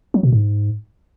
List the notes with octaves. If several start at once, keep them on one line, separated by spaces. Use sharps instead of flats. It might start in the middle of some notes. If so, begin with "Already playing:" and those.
F#3
B2
G#2